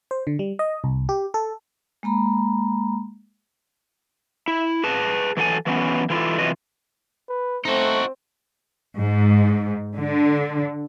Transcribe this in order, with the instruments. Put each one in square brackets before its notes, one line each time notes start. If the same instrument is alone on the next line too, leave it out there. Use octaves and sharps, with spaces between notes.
[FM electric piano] C5
D3
G3
D#5
C2
G4
A4
[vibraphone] G#3 A#3 A#5 B5
[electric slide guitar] E4
G#4 B4 A5
E3 F#3 A4 F#5 G#5
E3 F#3 B3 C#4
E3 E4 F4 A4
C3 E3 F#3 F4 B4 D#5
[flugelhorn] B4
[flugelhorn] A3 [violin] C4 [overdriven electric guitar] D#4 F#4
[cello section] G#2
D3